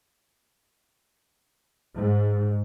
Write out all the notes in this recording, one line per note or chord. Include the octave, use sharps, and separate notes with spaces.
G#2